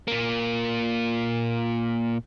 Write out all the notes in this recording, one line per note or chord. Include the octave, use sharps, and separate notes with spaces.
A#2 A#3